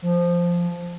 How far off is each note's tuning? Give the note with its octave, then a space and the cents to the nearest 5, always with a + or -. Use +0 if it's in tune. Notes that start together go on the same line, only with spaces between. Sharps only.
F3 -5